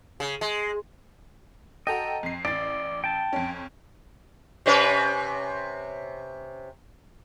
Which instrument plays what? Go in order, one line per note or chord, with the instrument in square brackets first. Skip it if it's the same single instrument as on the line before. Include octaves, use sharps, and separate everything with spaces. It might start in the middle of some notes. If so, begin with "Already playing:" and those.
[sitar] C#3
G#3
[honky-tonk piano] F#4 A4 G5 [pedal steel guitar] D#5 A#5
[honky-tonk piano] F2 C7
[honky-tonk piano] A1 A6 [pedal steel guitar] D5
[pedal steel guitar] G5 A5
[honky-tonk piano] F2 C#4
[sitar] C3 C#4 B4